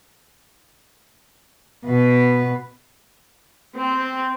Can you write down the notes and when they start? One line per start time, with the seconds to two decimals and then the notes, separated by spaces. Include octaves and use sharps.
1.86 B2 B4
3.76 C4